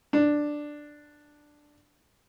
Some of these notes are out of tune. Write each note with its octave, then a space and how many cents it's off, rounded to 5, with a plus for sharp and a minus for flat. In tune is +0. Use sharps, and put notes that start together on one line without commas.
D4 +5